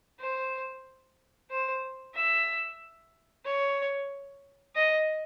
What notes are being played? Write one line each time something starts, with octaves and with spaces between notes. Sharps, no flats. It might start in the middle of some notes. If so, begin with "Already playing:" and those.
C5
C5
E5
C#5
D#5